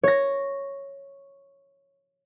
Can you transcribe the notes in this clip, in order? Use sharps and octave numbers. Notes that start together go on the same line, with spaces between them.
C#5 A#6